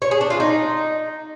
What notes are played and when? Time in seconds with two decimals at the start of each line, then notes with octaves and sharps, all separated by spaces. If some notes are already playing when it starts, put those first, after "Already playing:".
0.02 C#5
0.11 G#4
0.21 D4
0.30 F4
0.40 D#4